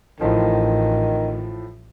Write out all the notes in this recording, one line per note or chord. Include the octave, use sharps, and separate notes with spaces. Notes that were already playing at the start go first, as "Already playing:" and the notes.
A1 A2 D#3 F3